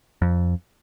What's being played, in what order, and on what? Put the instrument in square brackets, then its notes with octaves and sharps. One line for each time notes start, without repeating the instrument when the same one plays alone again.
[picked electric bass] F2